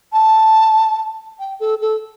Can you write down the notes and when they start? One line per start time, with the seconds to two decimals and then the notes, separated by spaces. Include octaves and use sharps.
0.13 A5
1.39 G5
1.60 A4
1.81 A4